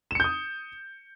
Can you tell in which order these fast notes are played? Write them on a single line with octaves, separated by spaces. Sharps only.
E7 C#7 G6 D#6